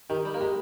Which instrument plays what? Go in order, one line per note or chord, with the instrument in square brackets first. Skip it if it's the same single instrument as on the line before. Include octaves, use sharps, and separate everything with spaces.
[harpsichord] D#3 [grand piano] G4
[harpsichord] G3
A#3
[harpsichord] G#3 [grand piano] G4